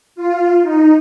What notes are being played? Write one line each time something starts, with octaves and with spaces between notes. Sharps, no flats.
F4
D#4